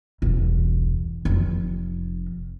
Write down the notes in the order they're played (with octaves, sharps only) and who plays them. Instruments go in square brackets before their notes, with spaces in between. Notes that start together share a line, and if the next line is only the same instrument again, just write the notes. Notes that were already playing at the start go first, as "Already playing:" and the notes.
[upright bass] E1 C2
F1